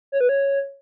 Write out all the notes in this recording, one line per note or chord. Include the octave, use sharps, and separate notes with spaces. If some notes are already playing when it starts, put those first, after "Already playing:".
C#5
B4
C#5